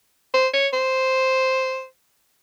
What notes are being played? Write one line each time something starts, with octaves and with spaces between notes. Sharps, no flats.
C5
C#5
C5